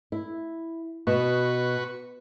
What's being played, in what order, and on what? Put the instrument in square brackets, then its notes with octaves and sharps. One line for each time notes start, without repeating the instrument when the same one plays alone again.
[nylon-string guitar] E4
[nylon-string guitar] B2 [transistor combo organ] F#4 B4 C#6